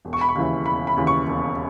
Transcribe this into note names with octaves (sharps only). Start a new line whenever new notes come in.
E1
C#6
B5
C#6
D#2 C#3 E3
E1 B5
B5
D#2 C#3 E3
C#6
E1